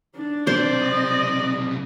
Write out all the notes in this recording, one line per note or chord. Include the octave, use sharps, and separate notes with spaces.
D4
B1 C3 C5 D5
D#5